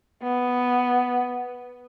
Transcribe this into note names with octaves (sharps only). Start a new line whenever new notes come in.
B3